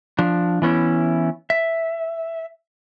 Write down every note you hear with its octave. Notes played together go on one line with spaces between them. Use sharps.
F3 D4
E3 B3 C#4 E4
E5